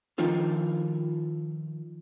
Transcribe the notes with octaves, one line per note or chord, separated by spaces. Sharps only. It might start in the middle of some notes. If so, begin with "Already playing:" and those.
D#3 F3 D#4 F4 A4